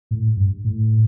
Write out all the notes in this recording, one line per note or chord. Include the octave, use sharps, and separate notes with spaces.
A2
G2
A2